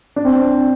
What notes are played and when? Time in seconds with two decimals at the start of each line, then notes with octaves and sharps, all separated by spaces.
0.16 D4
0.25 C4